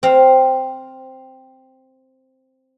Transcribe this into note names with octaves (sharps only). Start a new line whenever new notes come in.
C4 F5